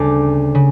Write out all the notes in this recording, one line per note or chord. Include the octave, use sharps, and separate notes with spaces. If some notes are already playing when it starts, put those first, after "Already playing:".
Already playing: D2 C#3 G3 D5 D6
C#3